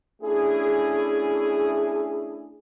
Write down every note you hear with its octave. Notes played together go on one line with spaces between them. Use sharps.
A3 C#4 D4 E4 G#4